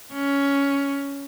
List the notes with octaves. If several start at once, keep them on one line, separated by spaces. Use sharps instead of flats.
C#4